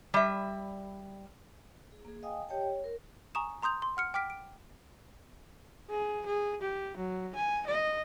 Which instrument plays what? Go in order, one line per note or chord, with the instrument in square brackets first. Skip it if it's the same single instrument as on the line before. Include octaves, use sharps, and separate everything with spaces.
[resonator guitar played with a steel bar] G3 E5
[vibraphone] G#4
A#3 G#4
D#5 F5 G5 G#5 D#6
G4 C#5 D#5 G5 A5
C#5
A#4
[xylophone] G#5 A#5 C#6 D#6 E7
A#5 C6 D#6 G6 F7
C6
F#5 F6 C#7
G5 D6 F6 B6 D7
D7
[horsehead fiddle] G#4
G#4
G4
F#3
G#5
D#5